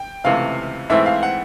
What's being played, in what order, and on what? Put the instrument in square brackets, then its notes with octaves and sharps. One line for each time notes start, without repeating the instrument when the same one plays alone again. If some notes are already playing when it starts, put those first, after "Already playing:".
Already playing: [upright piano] G5
[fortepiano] C#2 C3 E3 A3 [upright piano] F5
[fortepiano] G#2 E3 A3 C4 E4 [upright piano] E5
[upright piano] F5
F#5